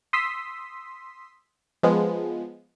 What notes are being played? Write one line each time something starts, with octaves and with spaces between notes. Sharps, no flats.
C6 D#6 E6 B6
F3 G#3 B3